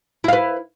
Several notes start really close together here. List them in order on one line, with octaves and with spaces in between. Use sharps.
E4 F5 B4